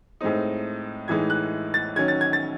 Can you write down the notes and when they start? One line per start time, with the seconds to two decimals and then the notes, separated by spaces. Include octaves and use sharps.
0.21 A2 G#3 C4 D#4
1.08 A2 E3 G#3 D#4 G#6
1.30 F#6
1.74 A6
1.96 D#3 F#3 C#4 G#6
2.08 A6
2.21 G#6
2.33 A6